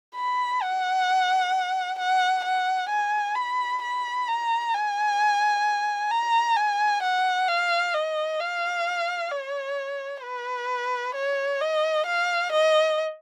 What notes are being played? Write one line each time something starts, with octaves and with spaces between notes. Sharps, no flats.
B5
F#5
F#5
F#5
G#5
B5
B5
A#5
G#5
A#5
G#5
F#5
F5
D#5
F5
C#5
B4
C#5
D#5
F5
D#5